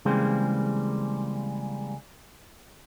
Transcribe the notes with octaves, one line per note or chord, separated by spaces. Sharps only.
C#3 E3 G3 G#3 A#3 C4